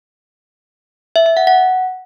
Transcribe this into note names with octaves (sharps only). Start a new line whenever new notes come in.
E5
E5
F#5
F#5